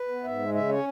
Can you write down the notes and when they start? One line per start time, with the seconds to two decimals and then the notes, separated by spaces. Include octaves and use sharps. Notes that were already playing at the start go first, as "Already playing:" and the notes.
Already playing: B4
0.08 B3
0.24 G#2 E5
0.39 G#3
0.54 C#3 E5
0.69 C#4 C#5